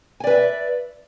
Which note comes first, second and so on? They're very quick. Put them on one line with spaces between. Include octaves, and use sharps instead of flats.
G#5 D5 B4 E5